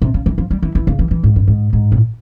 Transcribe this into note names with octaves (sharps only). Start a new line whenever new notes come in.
C3
C#3
E3
F3
G3
E3
E3
C#3
E3
E3
G#2
G2
G#2
G#2
A#2